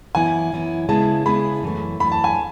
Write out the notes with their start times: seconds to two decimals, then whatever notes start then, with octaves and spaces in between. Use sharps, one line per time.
0.15 F#2 E3 B3 E4 G#5
0.52 F#2 E3 B3 E4
0.89 C#3 G#3 B3 E4 G#4 A5
1.26 C#3 G#3 B3 E4 G#4 B5
1.63 F#2 E3 A3
1.99 F#2 E3 A3 B5
2.12 A5
2.24 G#5